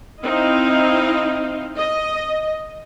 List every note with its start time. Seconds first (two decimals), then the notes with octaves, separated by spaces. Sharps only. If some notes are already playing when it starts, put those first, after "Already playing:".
0.22 C4 D#4 E4 D#5 F5
1.77 D#5